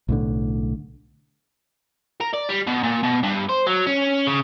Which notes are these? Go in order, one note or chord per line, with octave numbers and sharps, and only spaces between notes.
B1 A2 D3
A#4
D5
G3
B2
A#2
B2
G2
C5
F#3
C#4
C#3